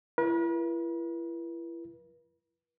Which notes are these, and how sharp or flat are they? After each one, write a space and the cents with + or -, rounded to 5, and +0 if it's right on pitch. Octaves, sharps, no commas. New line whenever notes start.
E4 +35 B4 -45